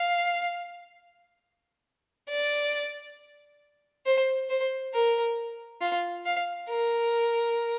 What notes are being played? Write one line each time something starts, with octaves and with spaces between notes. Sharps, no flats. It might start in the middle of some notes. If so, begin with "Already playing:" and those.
Already playing: F5
D5
C5
C5
A#4
F4
F5
A#4